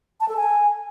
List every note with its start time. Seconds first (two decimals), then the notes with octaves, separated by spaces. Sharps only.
0.20 A5
0.29 A4
0.37 G#5